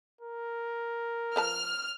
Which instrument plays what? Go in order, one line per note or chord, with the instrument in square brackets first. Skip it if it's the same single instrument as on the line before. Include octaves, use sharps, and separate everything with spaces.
[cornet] A#4
[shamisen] F3 B4 A5 [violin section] F6